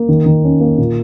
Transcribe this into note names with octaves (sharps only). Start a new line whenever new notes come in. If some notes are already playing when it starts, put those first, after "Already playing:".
Already playing: A#3
D#3
D#3
C#4
A#3
A#2